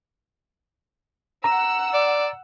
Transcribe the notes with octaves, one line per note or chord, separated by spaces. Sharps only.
F#5 A#5 E6
D5